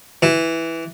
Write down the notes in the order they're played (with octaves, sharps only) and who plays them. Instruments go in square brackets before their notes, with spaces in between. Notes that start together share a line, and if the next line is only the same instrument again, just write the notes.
[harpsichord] E3